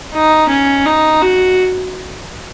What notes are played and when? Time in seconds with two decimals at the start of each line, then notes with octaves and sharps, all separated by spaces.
0.14 D#4
0.49 C#4
0.86 D#4
1.22 F#4